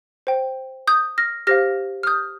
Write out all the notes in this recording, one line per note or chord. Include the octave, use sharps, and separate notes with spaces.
C5 G5
D#6 G6
F6 A#6
G4 C5 F5 F6 A#6
F6
D#6 G6